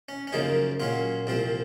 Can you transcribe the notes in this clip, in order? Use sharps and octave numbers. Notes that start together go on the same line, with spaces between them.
C#4
C#4
F#2 C#3 F3 A#3 D#4
A#2 F#3 C#4 F4
C2 A#2 F3 C4